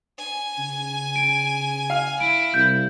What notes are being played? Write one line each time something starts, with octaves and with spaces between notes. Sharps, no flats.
G#5
C#3
D7
F5
E4 D7
C2 G6